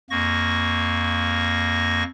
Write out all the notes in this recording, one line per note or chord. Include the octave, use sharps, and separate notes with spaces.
F2 A#3 C#6 A#6